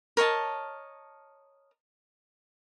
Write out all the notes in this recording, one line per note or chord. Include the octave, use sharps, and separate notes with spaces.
A#4 C#5 D#5 A5